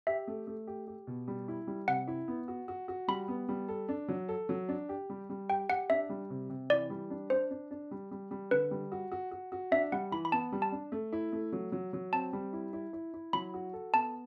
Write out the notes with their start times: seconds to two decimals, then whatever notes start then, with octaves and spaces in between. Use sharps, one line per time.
0.07 G4 E5
0.27 A3
0.47 A3
0.67 G4
0.87 G4
1.07 B2
1.28 G3
1.48 E4
1.67 G3
1.88 C3 F#5
2.08 E4
2.28 B3
2.48 F#4
2.68 F#4
2.88 F#4
3.08 G3 B5
3.28 B3
3.49 G3
3.69 A4
3.89 D4
4.08 F#3
4.29 A4
4.49 F#3
4.69 D4
4.89 G4
5.10 G3
5.29 G3
5.50 G4 G5
5.70 G4 F#5
5.90 D4 E5
6.09 G3
6.30 C3
6.50 C3
6.70 E3 D5
6.90 G3
7.10 D4
7.30 D4 C5
7.51 D4
7.71 D4
7.91 G3
8.11 G3
8.31 G3
8.51 D3 B4
8.71 G3
8.92 F#4
9.12 F#4
9.31 F#4
9.52 F#4
9.71 D4 E5
9.92 G3 F#5
10.12 E3 B5
10.25 B5
10.32 B3 A5
10.52 G3
10.62 A5
10.72 D4
10.92 A3
11.13 E4
11.32 A3
11.53 F#3
11.72 F#3
11.93 F#3
12.13 C4 A5
12.33 G3
12.53 E4
12.73 E4
12.93 E4
13.14 E4
13.33 F#3 B5
13.54 F#4
13.73 A4
13.94 B3 A5